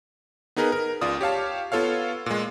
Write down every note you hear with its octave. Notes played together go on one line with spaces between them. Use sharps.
B3 D#4 G#4 A#4 B4
A#4
C#2 F4 D5 D#6
G4 C#5 F5 A5
B3 F4 A4 C#5 F5
A#2 G#3